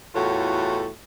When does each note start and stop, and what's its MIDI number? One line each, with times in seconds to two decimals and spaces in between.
0.15 0.87 40
0.15 0.87 45
0.15 0.87 65
0.15 0.87 66
0.15 0.87 69
0.15 0.87 73